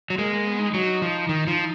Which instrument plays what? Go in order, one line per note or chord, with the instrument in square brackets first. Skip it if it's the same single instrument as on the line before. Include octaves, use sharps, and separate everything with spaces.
[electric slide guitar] F#3
[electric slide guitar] G#3 [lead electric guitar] A#3
[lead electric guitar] A#3
B3
D#4
[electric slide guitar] F#3 [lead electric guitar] D#4
[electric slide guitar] F3
D#3
F3